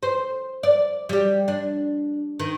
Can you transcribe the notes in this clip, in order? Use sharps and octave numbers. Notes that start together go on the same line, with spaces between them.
C5
D5
G3 G4
D4
D#3